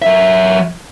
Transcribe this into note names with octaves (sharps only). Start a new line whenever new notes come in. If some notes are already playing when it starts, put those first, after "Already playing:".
F#3 E5